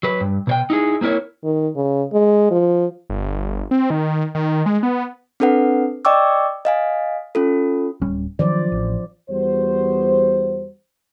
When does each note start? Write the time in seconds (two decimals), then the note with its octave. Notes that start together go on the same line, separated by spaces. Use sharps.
0.03 F#3 B4
0.21 G2
0.47 B2 C#5 G5
0.70 D#4 E4 G#4
1.01 A#3 C4 E4 A#4 C#5
1.44 D#3
1.76 C#3
2.13 G#3
2.51 F3
3.10 G1
3.71 C4
3.90 D#3
4.35 D#3
4.66 G#3
4.83 B3
5.40 C4 D4 A4 B4 F#5
6.05 D5 D#5 G5 C#6 D6 E6
6.65 D#5 F5 G#5
7.35 C#4 F4 A4
8.02 D1 G3 C#4
8.39 D#3 F3 F#3 C5 D5
8.72 A1
9.29 E2 G3 B3 F#4 C5